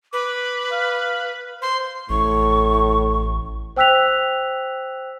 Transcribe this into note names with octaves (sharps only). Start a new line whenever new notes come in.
B4 D6
F5
C5 C6
A1 A2 C#6
C5 G5 E6 F#6 B6 F7